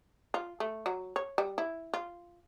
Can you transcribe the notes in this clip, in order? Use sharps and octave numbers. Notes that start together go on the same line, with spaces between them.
F4
A3
F#3
C#5
G3
E4
F4